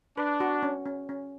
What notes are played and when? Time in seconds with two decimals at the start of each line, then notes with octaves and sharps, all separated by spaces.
0.17 D4 B4
0.40 F#4
0.63 C#4
0.86 C#4
1.09 C#4